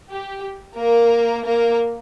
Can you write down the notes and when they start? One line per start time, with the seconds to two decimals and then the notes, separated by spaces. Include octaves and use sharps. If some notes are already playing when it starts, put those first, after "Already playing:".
0.12 G4
0.78 A#3 A#4
1.46 A#3 A#4